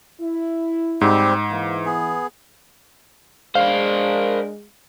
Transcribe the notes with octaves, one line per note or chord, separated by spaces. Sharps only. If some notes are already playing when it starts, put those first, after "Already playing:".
E4
G#2 G3 C4 G4
E3 A#3
B3 G#4
G#3 D4 A#4 C5 F5